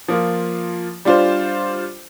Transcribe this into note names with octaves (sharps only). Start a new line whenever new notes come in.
F3 A#3 F4
G3 D4 F4 C5